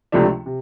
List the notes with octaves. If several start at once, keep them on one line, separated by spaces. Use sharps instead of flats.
C#2 C3 F3 A3 D4
C3